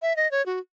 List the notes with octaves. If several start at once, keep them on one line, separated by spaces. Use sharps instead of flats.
E5
D#5
C#5
F#4